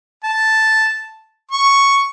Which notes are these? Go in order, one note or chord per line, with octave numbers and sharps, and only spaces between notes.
A5
C#6